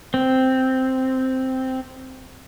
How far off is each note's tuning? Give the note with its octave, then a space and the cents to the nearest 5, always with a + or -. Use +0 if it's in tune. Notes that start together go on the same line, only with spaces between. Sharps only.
C4 -5